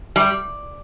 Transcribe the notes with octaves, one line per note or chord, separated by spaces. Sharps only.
G3